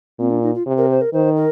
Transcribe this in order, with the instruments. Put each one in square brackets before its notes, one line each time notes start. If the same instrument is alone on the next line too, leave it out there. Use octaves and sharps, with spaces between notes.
[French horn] A#2 [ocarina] C4
[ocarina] D4
D#4
F4
[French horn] C3
[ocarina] A#4
C5
A#4
[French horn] D#3 [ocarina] C5
[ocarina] A#4